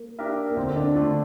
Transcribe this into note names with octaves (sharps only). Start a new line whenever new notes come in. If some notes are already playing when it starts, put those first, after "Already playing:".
Already playing: A#3
D4 G4 A#4 E5
A#3
D2 C4
D4
D3 A3 D4 F4